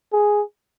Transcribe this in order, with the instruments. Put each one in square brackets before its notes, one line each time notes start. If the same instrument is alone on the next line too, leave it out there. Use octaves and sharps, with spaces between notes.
[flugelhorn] G#4